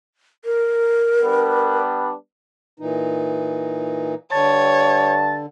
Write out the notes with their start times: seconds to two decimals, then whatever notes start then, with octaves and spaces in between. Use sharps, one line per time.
0.45 A#4
1.23 G3 B3 D4
2.80 A#2 E3 D#4
4.32 G2 D3 C#5 A5